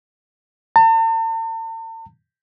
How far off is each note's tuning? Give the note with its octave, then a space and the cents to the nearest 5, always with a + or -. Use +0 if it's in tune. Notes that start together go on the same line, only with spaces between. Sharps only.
A5 +45